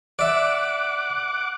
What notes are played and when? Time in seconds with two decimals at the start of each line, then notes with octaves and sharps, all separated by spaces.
0.19 D5 E5 F#5 D6